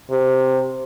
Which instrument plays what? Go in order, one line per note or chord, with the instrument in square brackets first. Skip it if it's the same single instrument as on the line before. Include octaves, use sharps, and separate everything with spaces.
[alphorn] C3